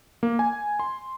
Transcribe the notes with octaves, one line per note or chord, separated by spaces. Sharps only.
A#3
G#5
C6